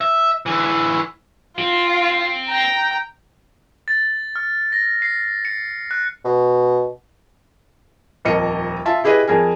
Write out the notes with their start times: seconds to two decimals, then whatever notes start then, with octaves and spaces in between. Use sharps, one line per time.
0.01 E5
0.46 D3 E3
1.59 C4 F4
2.49 G5 A#5
3.88 A6
4.36 F6
4.72 A#6
5.02 C7
5.45 C#7
5.91 F#6
6.25 B2
8.25 D#1 F2 A#4 D#5 C#7
8.85 F4 E5 A5
9.04 E4 G4 G#4 B4 D#5
9.27 F2 G#4 A#4 G#5